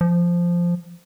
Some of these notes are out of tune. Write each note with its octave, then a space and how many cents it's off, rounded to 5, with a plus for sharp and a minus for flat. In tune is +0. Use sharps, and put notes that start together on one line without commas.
F3 -5